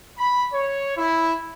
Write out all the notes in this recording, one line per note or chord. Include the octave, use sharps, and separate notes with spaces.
B5
C#5
E4